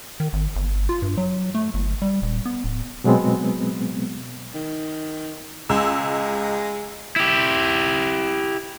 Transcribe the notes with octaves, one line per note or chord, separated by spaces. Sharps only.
D#3
G#1
G1
F4
G2
F#3
A3
G1
G3
D#1
B3
D1
B2 F#3 G#3 B3 C4
D#3
C#2 G#3 E6
E4 G4